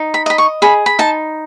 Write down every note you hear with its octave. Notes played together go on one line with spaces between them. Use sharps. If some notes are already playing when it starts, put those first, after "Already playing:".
Already playing: D#4
B5
D#5 B5
C#6
G#4 B5
B5
D#4 A5